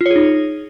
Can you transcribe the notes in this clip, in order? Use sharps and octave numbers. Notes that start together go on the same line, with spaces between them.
F4
C#5
G#4
D#4